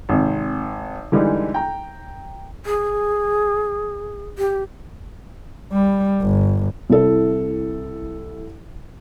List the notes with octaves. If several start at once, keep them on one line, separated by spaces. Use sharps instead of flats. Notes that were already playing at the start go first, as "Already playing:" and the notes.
G#1 C3
D3 E3 G3 G#3 D4 D#4
G5 A#5
G#4
G4
G3
G1
C2 E4 A4